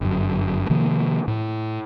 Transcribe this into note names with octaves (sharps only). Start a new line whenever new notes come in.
G1 F#2
C3 D#3 F3 A#3
A2